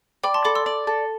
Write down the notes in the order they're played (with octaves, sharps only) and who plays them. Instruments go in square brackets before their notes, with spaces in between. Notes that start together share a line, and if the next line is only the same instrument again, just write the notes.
[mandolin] D5 [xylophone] G5 B5
[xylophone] A5 C6
[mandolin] A4 [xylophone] B5 D6
[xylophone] C6 E6
[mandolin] D5
A4